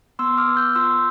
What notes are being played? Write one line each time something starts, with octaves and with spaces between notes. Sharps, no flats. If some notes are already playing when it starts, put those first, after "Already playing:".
B3 C6 E6
D6 F6
B3
E6 G6
F4 C6 E6